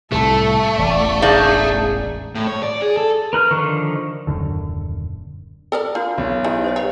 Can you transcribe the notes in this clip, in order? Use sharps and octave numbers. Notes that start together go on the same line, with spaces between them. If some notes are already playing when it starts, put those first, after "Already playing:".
C2 A2 C3 A3 A4
E1 A1 D5
D#4 G#4 D5 F5
A2
C#5
D5
G#4
A4
A#4 B4 F6
D3 D#3 F3 C#6
D#1 F#2 D3
A4 A#4 D5
A#3 D4 F4 F#4
B1 C#3
E2 D#4 G4 G#5
G2 C5 C#5 D#5
C#5 F#5